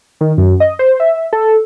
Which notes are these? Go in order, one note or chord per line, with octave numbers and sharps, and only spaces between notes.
D#3
F#2
D#5
C5
E5
A4